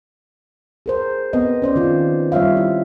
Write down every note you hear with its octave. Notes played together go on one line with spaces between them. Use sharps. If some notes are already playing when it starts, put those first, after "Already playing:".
G#4 A#4 C5
B3 C4 D#5
C#4 C5 D5
D#3 F4
G3 F4 C#5 E5 F5
E4